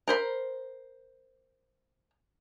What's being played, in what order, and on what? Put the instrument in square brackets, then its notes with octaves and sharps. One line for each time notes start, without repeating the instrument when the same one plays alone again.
[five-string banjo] A#4 C5 B5